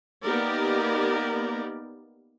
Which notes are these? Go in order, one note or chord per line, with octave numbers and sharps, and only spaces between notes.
A#3 B3 D#4 G4 A#4 D5